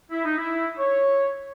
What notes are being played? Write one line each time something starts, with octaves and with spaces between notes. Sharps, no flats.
E4
D#4
E4
C#5